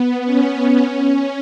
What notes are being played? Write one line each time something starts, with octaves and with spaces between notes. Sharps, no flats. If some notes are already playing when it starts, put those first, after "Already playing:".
Already playing: B3
C#4
C#4